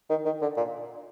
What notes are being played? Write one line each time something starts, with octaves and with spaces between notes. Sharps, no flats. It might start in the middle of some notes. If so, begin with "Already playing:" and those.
D#3
D#3
D3
A#2